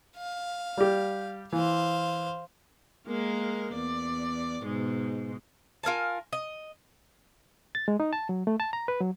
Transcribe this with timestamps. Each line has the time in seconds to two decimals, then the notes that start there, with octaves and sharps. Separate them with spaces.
0.18 F5
0.77 G3 G4
1.53 E3 C5 F5
3.07 G#3 A#3 A#4
3.75 E2 D5
4.63 G#2 B2 G#3
5.83 F4 A#4 G#5 A5
6.33 D#5
7.75 A6
7.88 G#3
8.00 D#4
8.13 A5
8.29 F#3
8.47 A3
8.60 A5
8.73 A#5
8.88 B4
9.01 F#3